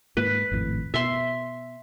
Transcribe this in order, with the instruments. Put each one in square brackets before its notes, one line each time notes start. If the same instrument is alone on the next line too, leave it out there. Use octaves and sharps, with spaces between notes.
[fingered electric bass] G#2 A#3 [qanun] B4
[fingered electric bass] G#1 F2 A2
[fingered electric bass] B2 [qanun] E5 C6